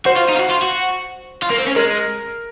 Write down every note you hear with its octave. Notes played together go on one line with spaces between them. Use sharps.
F#4 C5
F4
D#4
F4
F#4
F4
F#4
F4
A#3
C4
C#4
G#3 A#4